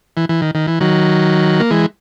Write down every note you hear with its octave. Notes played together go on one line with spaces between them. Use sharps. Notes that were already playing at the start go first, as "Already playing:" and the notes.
E3
E3
D#3
D#3
E3
D#3 F#3
A#3
E3 G#3